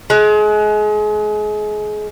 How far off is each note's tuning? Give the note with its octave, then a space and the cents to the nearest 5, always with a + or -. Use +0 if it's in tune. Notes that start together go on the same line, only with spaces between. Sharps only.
G#3 +30